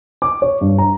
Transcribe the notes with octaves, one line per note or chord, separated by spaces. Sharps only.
D6
C#5
G2
A#5